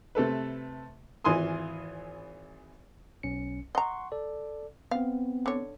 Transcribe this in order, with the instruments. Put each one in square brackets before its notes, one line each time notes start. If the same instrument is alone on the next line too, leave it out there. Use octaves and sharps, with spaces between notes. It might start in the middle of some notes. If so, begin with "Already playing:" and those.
[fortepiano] C3 A3 A4 B4
G#1 E3 F4 G#5 C6 D#6
[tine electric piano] B1 C#4 C#7
[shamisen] D#5 A#5 [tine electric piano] F#5 C6 C#6
[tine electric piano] A4 D5
[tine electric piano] B3 C4 [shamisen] F5
[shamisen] D3 C#5